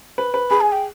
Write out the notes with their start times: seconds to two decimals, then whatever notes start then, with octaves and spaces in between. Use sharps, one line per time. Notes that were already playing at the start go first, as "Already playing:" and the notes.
0.18 B4
0.34 B4
0.50 G#4 B5
0.61 G#5
0.72 G5